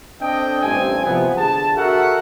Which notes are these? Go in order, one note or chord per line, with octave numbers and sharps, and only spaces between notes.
C4 D4 A4 D#5 G5
A1 G2 C4 G#5
C3 F3 B3
D3 G#4 A5
F#4 A4 A#4 E5 F#5